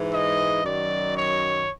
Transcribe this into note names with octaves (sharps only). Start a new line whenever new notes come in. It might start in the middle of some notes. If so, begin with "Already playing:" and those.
Already playing: G#2 E3
D#5
F#2 D#3 F#3 D5
C#5